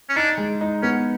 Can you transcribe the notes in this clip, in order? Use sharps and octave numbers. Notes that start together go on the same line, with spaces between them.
C#4
D4 D#4
G#3
D#4
B3 C#4